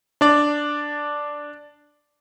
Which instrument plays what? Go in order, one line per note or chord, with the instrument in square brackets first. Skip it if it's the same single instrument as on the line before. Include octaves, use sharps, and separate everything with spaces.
[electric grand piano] D4 D5